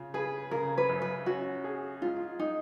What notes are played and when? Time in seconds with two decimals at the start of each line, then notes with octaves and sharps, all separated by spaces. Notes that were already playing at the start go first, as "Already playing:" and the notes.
Already playing: C#3 F4
0.14 G#4 B4
0.51 C#3 A#4
0.78 B4
0.89 F#2
1.02 B4
1.26 C#4 F#4
1.64 G#4
2.02 G#2 F4
2.39 D#4